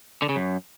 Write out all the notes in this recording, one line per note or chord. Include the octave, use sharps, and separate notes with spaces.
D3
C#3
F#2